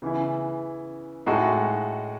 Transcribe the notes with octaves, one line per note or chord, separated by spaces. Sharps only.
C#3 E3 B3 E4
A2 G#3 D#4 F#4 A4